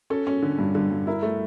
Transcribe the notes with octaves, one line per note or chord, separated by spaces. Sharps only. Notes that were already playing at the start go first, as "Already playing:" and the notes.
C#4 A4
C#4
D3
G2
D3
G2
E4 A#4
A3